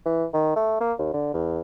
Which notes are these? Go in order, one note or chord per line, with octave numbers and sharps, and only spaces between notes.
E3
D#3
A3
A#3
D#2
D3
E2